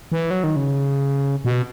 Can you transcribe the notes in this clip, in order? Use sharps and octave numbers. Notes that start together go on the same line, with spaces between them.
E3
F#3
D#3
C#3
B2